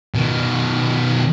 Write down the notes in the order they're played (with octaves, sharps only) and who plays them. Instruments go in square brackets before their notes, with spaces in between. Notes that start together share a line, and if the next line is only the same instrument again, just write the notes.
[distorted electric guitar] B2 D#3